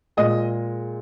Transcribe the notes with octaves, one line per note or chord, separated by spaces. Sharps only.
A#2 G#3 D#5